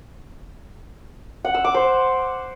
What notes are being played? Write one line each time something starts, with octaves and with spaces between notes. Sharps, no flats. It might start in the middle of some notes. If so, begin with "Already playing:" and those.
F#5
E6
D6
C5